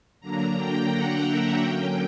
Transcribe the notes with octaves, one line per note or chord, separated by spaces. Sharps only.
D3 F#3 A#3 D4 A#5
G5
F#5
E5
D3 F#3 A#3 C#4 G5